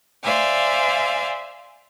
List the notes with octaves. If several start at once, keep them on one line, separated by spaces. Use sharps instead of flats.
C5 D5 E5 F5 G#5